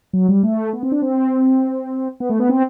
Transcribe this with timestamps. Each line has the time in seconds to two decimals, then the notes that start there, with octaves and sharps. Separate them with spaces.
0.13 F#3
0.29 G3
0.43 A3
0.73 B3
0.83 C4
0.92 D4
1.02 C4
2.20 B3
2.30 A3
2.40 B3
2.49 C4